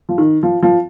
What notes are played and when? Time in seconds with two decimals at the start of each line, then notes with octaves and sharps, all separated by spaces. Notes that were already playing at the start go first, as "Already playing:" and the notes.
0.09 F3
0.18 D#3
0.43 F3
0.63 F3